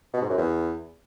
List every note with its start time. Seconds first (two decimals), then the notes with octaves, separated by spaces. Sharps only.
0.14 B2
0.22 G#2
0.30 F#2
0.38 E2